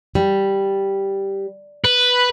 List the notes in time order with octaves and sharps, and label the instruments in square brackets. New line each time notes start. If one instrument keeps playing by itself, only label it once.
[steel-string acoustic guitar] G3
[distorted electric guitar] B4